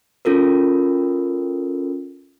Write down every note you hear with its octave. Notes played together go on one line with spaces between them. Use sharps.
C#4 F4 A4 A#4